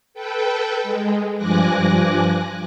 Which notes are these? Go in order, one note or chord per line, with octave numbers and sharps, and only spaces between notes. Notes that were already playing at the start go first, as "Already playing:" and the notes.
A4 B4 G5
G#3
G2 F3 G#5 D6 F#6 A#6